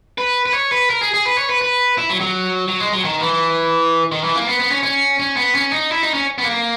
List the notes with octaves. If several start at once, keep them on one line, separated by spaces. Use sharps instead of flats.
B4
B4
C#5
B4
A#4
G#4
G#4
B4
C#5
B4
B4
E4
F#3
F#3
F#3
G#3
F#3
D#3
E3
D#3
E3
A#3
B3
B3
C#4
C#4
C#4
B3
C#4
D#4
E4
D#4
C#4
B3
A#3